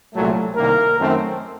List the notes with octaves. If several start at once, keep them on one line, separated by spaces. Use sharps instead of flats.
C2 A#2 F#3 A3
C2 C3 D#3 A#3 A#4
F#2 D#3 A3 C4